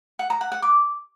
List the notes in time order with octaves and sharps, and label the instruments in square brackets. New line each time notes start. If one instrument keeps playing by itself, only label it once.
[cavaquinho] F#5
A#5
F#5
F#5
D6